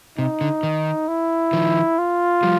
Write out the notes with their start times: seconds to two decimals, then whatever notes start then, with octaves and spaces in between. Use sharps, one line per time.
0.18 C3 D#4
0.41 D3
0.63 D#3
1.08 E4
1.53 D#3 F3
1.98 F4
2.43 F3 G3